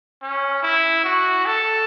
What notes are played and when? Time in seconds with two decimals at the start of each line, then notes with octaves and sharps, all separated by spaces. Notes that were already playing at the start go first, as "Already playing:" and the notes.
0.23 C#4
0.63 E4
1.04 F#4
1.46 A4